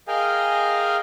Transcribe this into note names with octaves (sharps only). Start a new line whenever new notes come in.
G#4 A#4 D#5 F5 G5 G#5